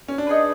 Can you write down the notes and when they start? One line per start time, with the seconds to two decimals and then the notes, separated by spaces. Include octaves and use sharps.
0.08 C#4
0.18 D4
0.27 D#4 G#4 B4